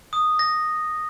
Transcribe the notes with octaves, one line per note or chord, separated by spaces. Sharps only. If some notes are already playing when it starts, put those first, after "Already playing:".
D#6
A#6